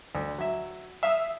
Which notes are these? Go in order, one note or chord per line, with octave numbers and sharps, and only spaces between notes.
D2
F#3 E5
E5 F5 D#6